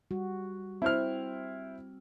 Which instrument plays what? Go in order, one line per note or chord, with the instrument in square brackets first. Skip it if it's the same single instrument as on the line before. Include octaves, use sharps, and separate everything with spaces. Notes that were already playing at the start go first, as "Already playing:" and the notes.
[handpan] G3 F#4
[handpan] C4 [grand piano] E4 C5 F6